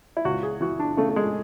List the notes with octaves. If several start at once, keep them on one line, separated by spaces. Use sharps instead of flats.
E4
C#2 F#4
G#4
E3 F#4
D4
C#3 A3
A3
G#3